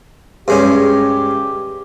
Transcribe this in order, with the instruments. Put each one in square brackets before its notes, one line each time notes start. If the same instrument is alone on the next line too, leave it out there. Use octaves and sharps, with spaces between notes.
[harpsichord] G2 G#3 C#4 [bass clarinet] G4